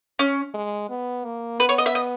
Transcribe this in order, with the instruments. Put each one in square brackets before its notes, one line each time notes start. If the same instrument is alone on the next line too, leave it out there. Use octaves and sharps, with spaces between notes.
[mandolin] C#4
[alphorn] G#3
B3
A#3
[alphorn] B3 [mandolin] B4
[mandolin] C#5
D#5
E5
D#5